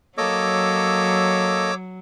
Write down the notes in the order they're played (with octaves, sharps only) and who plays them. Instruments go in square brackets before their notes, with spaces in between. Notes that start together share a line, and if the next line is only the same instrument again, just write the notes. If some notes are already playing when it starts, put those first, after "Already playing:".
[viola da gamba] F#3 [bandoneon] A#3 A4 D#5 [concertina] C#5 D6 E6